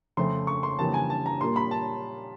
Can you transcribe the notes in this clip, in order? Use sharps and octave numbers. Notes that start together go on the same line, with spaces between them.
F2 C#3 F3 A3 C6
C#6
C6
F2 C#3 E3 G3 A#3 A5
G#5
A5
A#5
A#2 G3 A#3 C6
B5
A5